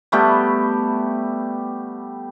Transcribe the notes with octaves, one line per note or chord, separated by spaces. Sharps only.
G3 A3 B3 G4